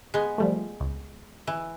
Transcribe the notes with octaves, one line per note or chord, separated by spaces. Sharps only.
G#3 B3
F3 G3 A3
C#2
E3